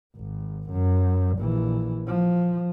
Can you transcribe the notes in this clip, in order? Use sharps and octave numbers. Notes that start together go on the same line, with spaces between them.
G#1
F#2
A#1 E3
F3